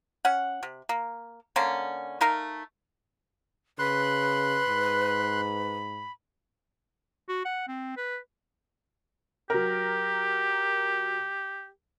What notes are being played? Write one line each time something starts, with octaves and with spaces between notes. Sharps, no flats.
C#4 F#5
C3
A#3
D3 A#3 C#4
A3 D#4 A#4 F5
C#3 B4 B5 C6 F#6
G#2
F#4
F#5
C4
B4
F#3 G4 A#4